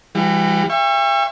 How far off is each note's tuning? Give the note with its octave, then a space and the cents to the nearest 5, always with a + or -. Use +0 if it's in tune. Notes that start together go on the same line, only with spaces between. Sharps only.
E3 +30 G3 +35 F#4 +0
E5 +35 G5 +40 C#6 -10